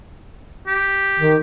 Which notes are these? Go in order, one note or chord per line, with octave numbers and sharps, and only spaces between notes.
G4
D#3